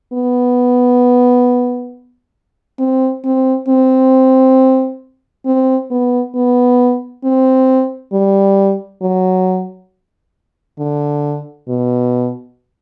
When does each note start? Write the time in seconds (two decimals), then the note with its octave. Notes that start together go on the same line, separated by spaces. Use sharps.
0.13 B3
2.79 C4
3.25 C4
3.68 C4
5.46 C4
5.91 B3
6.35 B3
7.24 C4
8.13 G3
9.02 F#3
10.79 D3
11.68 B2